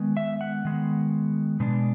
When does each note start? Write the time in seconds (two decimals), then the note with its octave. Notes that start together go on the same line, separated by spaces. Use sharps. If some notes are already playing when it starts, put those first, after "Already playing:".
Already playing: D#3 G#3 B3
0.17 E5
0.41 F#5
0.65 D#3 G#3 B3
1.60 B2 G#3 B3 D4